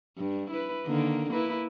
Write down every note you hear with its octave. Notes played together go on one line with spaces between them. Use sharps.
G2
E4 B4
D3 D#3 A#3
A#3 E4 B4